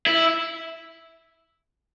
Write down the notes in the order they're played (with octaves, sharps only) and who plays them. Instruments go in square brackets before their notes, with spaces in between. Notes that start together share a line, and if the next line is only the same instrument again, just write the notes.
[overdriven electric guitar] E4